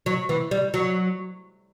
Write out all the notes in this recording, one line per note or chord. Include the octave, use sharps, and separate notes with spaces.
F#3
E3
G3
F#3